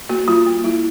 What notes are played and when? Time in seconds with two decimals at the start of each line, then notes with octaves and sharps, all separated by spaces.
0.09 A#3 F#4
0.28 G3 F4
0.46 A#3
0.64 G3 E4